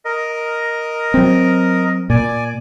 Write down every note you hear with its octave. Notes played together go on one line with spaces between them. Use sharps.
A#4 D#5
F#3 C4
A#2 D5 G#5